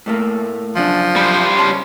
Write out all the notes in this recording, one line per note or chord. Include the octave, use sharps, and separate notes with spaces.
A2 A3 A#3
F#2 C#3 F3 D4
G3 C5
C#2 C#4 A5 C6